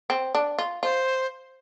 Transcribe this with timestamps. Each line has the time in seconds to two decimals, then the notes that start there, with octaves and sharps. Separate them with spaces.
0.10 C4
0.35 D4
0.59 F4
0.83 F4 C5